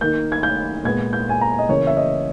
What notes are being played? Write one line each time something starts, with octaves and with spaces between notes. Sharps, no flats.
D#3 A#3 G6
G#6
G6
A#2 G#3 B3 G#6
G6
G#5
A#5
D#5
C#3 E3 A#3 C#5
E5
D#5